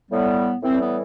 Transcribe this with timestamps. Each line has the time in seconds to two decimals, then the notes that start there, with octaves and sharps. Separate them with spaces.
0.10 A2 G3 B3
0.63 A2 E3 G3 C4
0.80 B3